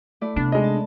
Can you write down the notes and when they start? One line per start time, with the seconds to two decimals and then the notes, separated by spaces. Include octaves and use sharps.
0.21 A3 E4 D5
0.36 C3 B3 D4
0.52 G#3 D#4 D#5
0.64 A5